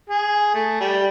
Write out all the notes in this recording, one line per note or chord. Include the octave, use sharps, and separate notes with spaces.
G#4
A3
G3